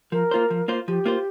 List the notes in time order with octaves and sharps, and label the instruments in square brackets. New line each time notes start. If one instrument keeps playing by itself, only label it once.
[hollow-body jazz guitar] F3 [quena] A#4
[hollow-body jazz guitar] A#3 F4 C5
F3
A#3 F4 C5
[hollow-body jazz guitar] F3 [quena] G4
[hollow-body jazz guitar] A#3 F4 C5